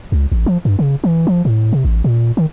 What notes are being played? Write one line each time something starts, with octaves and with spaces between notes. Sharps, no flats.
C#2
A1
F3
G2
C#3
E3
F3
A2
C3
A1
A#2
D#3